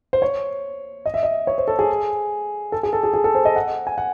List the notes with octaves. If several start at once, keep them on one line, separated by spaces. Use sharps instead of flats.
C5
C#5
D#5
E5
D#5
C#5
C5
A4
G#4
A4
G#4
A4
G#4
G#4
A4
C5
D#5
F#5
G#5
F#5